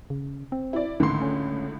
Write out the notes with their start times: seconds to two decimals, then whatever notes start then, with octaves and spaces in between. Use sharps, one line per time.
0.10 C#3
0.52 C4
0.73 E4 D5
1.00 C#2 A2 D3 D#3 C6
1.22 C#4